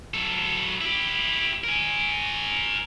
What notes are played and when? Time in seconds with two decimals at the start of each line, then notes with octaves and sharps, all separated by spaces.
0.14 F#3 A4
0.81 E4 G4
1.64 A#4 G#5